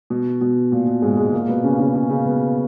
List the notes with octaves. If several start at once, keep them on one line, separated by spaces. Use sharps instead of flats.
B2
B2
A#2
B2
G#2 G#3
G#2 G#3
A#2 A#3
B2 B3
C#3 C#4
C#3 C#4
C#3 C#4
C#3 C#4
B2 B3